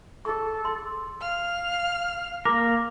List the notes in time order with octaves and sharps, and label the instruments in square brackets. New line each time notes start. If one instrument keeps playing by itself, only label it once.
[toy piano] G#4 C#6 [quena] A4
[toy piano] C6
[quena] F5 [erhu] F6
[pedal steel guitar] A#3 A#4 [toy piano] D6